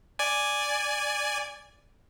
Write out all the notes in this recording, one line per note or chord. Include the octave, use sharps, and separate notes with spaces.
D5 G#5